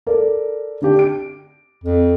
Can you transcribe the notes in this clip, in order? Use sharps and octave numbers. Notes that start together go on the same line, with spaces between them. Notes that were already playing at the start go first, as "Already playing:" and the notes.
A4 A#4 D5
D3 D4 G4
D7
F2